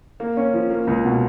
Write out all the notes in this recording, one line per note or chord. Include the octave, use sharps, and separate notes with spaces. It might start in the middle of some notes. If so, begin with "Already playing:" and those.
A#3
C#4
F3
A#3
C#2
B2